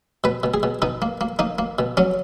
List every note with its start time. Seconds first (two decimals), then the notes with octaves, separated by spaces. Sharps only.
0.24 B2 B4
0.43 B2
0.54 G#4
0.63 B2
0.82 B2 D#4
1.02 A#3
1.21 A#3
1.39 A#3 D#4
1.59 A#3
1.79 B2
1.97 F#3 C#4